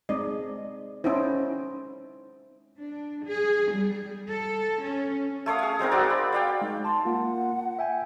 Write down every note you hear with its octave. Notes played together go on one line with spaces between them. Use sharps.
G#3 C4 D#4 D5 D#5
C#4 D#4 E4 C5
D4
G#4
G3
A4
C#4
A3 C#5 F5 D#6
G#4 F5
G#3 C4 D#4 A#4
C4 F#4 D5
B5
D5 F5 G5
G#3 D#4
A5 C6
A#3 F4 F#5
E5 G5 G#5